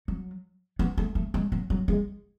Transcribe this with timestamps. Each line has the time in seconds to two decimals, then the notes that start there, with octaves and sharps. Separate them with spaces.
0.08 F#3
0.79 B3
0.98 A3
1.15 A3
1.34 G#3
1.52 F#3
1.70 F#3
1.88 G#3